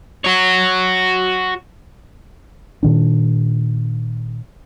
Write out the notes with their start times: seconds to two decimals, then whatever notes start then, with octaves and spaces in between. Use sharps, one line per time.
0.24 F#4 C#5
2.83 A#2 D#3 D4